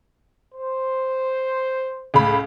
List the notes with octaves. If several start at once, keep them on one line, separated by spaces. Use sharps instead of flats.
C5
C#2 A2 B5